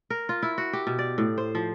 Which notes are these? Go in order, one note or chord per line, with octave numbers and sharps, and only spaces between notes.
A#4
F4
E4
F#4
G4
B2
D5
A2
C5
F3